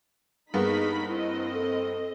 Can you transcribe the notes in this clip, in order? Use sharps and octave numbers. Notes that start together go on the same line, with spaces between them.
G2 A#3 B3 D#4 G#4 B5 B6
C4 E4 D#5
A4